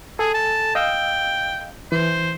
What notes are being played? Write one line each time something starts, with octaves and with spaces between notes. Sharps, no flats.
G#4 A4 G#5
A5
D#5 F5 G5 E6
E3 C5